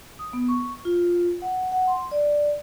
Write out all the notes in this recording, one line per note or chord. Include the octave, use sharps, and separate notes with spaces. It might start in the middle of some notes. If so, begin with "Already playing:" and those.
D#6
B3
C#6
F4
F#5
F#5
C6
D5